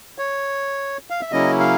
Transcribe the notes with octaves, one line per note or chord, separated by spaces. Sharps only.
C#5
F5
E5
C#3 F#3 A#3 C#4 E4 D#5
F5